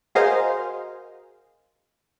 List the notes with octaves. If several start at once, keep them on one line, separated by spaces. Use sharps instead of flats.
F#4 G#4 A#4 C5 D#5 F5